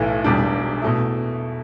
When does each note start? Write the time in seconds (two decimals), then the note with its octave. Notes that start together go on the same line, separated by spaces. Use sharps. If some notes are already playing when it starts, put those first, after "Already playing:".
Already playing: B1 A2 E3 A3
0.24 E1 E2 B2 G3 D4
0.82 B2 A3 E4